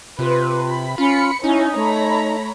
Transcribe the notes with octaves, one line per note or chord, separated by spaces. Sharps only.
C3 F4 B4
B5
C#4 F4 B5 C#7
C#4 D#4 E4
A3 C#5 A#5 B5